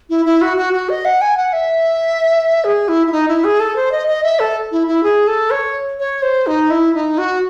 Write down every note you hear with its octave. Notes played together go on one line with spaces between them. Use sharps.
E4
E4
F#4
F#4
F#4
D#5
F#5
G#5
F#5
E5
G#4
E4
E4
D#4
E4
G#4
A4
C5
D#5
D#5
E5
A4
E4
E4
G#4
A4
C#5
C#5
C5
D#4
E4
D#4
F#4